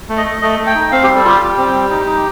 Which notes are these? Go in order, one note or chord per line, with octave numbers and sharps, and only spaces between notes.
A3
D#5
A3
A3 D#5
A3
G5
D#4
C4 F5
G3 G4
A4
F4 G4
G3
C4
G3
D#4
D#4